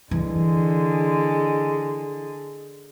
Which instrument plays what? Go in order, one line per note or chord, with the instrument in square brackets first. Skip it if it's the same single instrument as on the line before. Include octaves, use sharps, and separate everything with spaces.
[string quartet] D3 G#3 [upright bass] E3